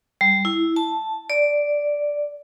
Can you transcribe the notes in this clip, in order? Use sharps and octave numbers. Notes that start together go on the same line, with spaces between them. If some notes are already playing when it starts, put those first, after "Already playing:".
G3
E4
A5
D5